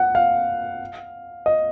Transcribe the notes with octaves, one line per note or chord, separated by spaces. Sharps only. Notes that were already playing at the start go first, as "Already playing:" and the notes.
Already playing: F#5
F5
D#5